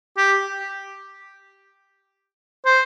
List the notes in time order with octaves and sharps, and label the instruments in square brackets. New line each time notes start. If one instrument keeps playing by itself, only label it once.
[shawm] G4
C5